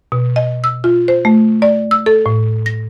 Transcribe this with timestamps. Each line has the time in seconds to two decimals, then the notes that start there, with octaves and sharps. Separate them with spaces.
0.12 B2
0.36 D#5
0.64 E6
0.84 F4
1.08 C5
1.25 A3
1.62 D5
1.91 E6
2.06 A4
2.26 A2
2.66 A#6